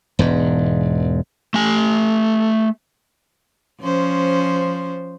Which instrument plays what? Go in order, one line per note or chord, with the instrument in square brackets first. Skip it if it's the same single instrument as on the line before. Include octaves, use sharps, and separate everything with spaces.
[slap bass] E1 G#2
[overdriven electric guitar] A3 G#5
[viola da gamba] F3 C#4 C5